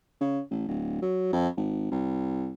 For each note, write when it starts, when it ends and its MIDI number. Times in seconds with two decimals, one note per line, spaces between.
0.21 0.40 49
0.51 0.63 33
0.68 0.97 26
1.02 1.29 54
1.33 1.48 41
1.57 1.87 32
1.91 2.52 36